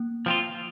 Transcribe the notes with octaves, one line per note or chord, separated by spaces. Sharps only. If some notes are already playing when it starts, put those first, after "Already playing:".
Already playing: A#3
F3 C4 F4